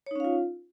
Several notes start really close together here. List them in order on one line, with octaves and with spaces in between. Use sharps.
C#5 D#4 C#4 F5 F4